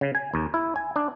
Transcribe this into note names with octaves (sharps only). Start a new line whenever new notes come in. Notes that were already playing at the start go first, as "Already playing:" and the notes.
C#3
G#5
D#2
E4
G#5
D4